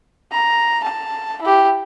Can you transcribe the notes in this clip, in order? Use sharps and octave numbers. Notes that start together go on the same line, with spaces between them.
A#5
A5
E4 G4